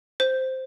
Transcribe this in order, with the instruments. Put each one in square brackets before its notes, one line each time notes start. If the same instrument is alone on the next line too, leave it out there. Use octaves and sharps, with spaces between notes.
[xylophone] C5